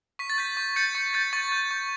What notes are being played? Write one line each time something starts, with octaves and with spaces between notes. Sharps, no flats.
C#6 B6
A6
G6 B6
C#6
G6 A6 C#7
C#6
G6 A6 C#7
C#6 A6
G6
C#6